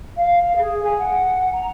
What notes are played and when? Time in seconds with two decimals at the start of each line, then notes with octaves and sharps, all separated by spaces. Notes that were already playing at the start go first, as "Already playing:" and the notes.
0.16 F5
0.39 F5
0.55 G#4
0.84 G#5
0.98 F#5
1.53 A#5